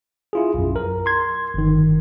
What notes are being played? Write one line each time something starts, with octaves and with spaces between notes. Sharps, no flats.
E4 F4 G#4
B1 F#2
A#4
C6 G#6
G1 D#3